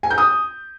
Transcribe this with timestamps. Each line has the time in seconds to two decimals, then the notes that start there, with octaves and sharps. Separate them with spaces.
0.03 G#5
0.10 G6
0.18 D#6